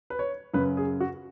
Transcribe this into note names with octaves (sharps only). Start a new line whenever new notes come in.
B4
C#5
F#2 C#3 B4
G#4
F#4